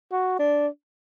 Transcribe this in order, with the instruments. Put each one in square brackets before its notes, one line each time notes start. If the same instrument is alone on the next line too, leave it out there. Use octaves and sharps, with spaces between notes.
[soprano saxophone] F#4
D4